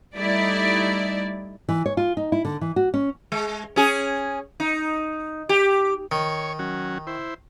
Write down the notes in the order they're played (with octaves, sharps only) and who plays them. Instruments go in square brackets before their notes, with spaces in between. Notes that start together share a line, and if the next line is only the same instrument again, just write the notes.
[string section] G3 A3 D#4 E4 D5
[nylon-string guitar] E3
C#5
F4
D#4
E4
D3
E3
F#4
C#4
[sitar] G#3
C#4 G#4
D#4
G4
[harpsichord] D#3 [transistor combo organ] C#5 C#6
[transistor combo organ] F#3 C#4 F#4
E4 C5